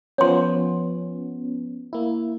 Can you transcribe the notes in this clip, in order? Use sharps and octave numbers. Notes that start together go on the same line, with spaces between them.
F3 B3 C#4 C#5 C6
A#3 E4